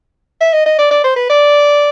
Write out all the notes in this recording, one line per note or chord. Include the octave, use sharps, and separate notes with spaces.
E5
D#5
D#5
D5
D5
C5
B4
D5